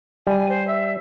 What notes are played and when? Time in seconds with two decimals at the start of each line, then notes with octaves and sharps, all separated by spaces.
0.27 G3 G#5
0.48 C5
0.67 E5